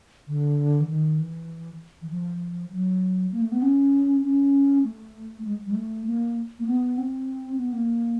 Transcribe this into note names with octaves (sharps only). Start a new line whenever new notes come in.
D3
E3
D#3
E3
E3
F3
F#3
A#3
A3
B3
C#4
C#4
A3
G#3
G3
G#3
A3
A#3
A#3
B3
C4
B3
A#3